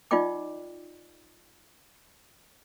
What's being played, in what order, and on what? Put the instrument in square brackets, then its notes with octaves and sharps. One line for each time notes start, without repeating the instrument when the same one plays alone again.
[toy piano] D#4 F4 D5 D#5 G5 D6